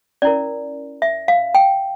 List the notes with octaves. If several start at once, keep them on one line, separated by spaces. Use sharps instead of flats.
C#4 E4 A#4 D5
E5
F5
G5